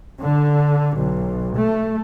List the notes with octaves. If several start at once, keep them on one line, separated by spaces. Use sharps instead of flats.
D3
B1
A3